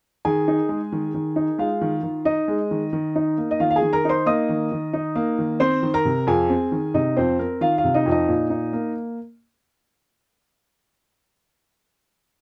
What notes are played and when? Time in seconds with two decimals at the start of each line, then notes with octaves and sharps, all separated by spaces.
0.25 D#3 G#4 G#5
0.48 D#4
0.69 G#3
0.92 D#3
1.14 D#3
1.36 D#4
1.58 G#3 F4 F5
1.81 D#3
2.03 D#3
2.25 D#4 D#5
2.48 G#3
2.71 D#3
2.93 D#3
3.15 D#4
3.38 A#3
3.51 D#5
3.60 D#3 F4 F5
3.71 F5
3.76 G#4 G#5
3.82 D#3
3.93 A#4 A#5
4.05 D#4 C5 C6
4.26 A#3 D#5 D#6
4.49 D#3
4.72 D#3
4.93 D#4
5.16 A#3
5.39 D#3
5.60 C4 C5 C6
5.83 D#3
5.94 A#4 A#5
6.05 C3
6.27 F2 G#4 G#5
6.50 C4
6.72 D#3
6.94 C3 D#4 D#5
7.17 F2 C4 C5
7.39 C4 A#4
7.61 D#3 F4 F5
7.78 F4 F5
7.84 C3
7.94 D#4 D#5
8.06 F2
8.11 D#4 D#5
8.28 A#2
8.50 D#4
8.73 A#3